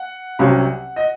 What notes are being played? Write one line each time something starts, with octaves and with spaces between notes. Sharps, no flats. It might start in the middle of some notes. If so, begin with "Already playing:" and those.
Already playing: F#5
C2 C3 F#3 C#4
D#5